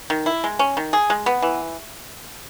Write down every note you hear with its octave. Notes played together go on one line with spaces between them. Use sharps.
D#3
E4
G#3
C#4
D#3
G#4
G#3
B3
E3